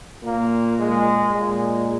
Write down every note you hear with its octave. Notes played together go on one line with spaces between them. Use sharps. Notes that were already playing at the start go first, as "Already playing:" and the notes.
A#2 A#3
G#3
A#2 G#3